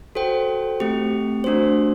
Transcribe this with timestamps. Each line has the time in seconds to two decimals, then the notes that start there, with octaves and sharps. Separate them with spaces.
0.15 F#4 A4 C5 G5
0.80 A3 C4 G4
1.44 A3 D4 F#4 C5